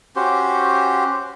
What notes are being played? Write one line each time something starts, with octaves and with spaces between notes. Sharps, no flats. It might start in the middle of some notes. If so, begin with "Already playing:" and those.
C#4 F#4 G4 C5